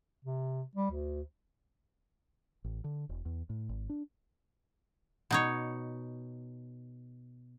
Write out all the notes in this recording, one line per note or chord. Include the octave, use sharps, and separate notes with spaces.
C3
G3
D2
A1
D3
E1
E2
A2
G#1
D4
B2 D#4 C#5